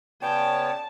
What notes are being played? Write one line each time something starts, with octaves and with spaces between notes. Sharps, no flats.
C#3 B3 C#5 D5 G5 A5